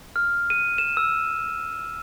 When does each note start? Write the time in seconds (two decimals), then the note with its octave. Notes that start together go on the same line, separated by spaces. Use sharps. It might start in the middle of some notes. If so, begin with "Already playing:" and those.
0.16 F6
0.50 D#7
0.78 E7
0.97 E6